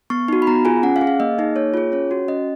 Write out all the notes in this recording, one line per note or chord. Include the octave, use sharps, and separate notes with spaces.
B3 C#6
D#4 F#4
B5
B3 A#5
F4 G#4 G#5
C#4 F#5
F5
G#4
F5
A#3 D#5
D#4 G#4
A#3 C#5
F4 G#4
C#4 C#5
F#4
C#4 D#5